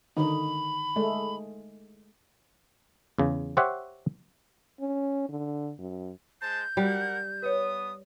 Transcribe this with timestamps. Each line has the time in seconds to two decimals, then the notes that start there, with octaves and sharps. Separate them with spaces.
0.17 D3 D#3 D#4 B5
0.96 G#3 A3
3.18 E2 C#3
3.57 G4 C5 C#5 E5 F#5
4.80 C#4
5.29 D3
5.79 F#2
6.41 G#3 C5 A5 G6
6.77 G3 A#4 F#5
7.43 B3 B4 C#5 D#6